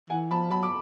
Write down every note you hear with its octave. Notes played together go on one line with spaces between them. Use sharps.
E3 F#5 G#5
F3 A5 B5
F#3 A5 B5
D6